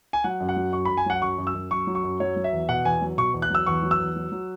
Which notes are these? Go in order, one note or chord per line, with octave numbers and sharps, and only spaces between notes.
G#5
F#3 F#5
F#2
F#5
F#3
F#2 C#6
F#2 B5
G#5
F#3 F#5
F#2 C#6
F#2
E6
F#2
F#2 C#6
F#3
C#6
F#2
F#3 C#5
F#3
E5
E2
B2 F#5
E2 G#5
F#3
B2 C#6
E2
F#6
F#3 E6
E2 C#6
F#3
E6
E2
F#3
F#3